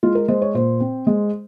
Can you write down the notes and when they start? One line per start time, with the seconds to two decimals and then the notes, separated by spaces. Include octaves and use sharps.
0.03 G#3 F4
0.15 A#4
0.28 G#3 C5
0.42 C#5
0.54 A#2 C5
0.80 C4
1.07 G#3